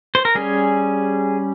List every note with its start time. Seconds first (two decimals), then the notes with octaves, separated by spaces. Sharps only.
0.15 C5
0.25 A#4
0.35 G3 C#4 G#4